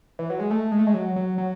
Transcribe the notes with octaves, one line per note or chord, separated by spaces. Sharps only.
E3
F#3
G#3
A3
G#3
A3
G#3
F#3
F#3
F#3